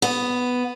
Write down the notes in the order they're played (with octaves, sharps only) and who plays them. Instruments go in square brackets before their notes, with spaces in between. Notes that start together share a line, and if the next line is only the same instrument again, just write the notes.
[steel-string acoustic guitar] B3